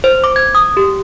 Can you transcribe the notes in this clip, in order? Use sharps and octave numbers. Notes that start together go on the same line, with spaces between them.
C5
D6
G#6
D#6
G4